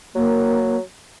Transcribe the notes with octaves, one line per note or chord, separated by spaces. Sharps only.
F#3 A#3